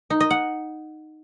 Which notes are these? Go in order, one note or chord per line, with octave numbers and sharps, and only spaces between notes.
D#4
D#5
F#5